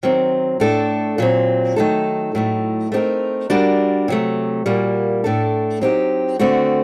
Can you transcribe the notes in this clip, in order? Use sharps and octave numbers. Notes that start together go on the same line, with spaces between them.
D#3 F#3 C4
A2 A3 D4 A4
A#2 F#3 C4
D#3 F#3 A3 D#4 A4
A2 F#3 A3 D#4
A3 C4 D#4 G4 A#4
G3 D4 F#4 A#4
C3 F#3 A3
A#2 G3 A#3 F#4
A2 A3 D4 A4
F#3 C4 D#4 G4
D3 A3 C4 F#4